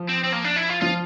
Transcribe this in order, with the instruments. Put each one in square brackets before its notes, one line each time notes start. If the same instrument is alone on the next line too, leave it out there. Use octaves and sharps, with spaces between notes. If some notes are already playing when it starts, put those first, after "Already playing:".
Already playing: [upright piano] F3
[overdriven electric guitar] C4
C4
A#3
D4
E4
F4
[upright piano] F3 [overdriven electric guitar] F4